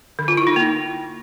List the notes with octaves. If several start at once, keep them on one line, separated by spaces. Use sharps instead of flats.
D3
F4
E4
D#4
A#3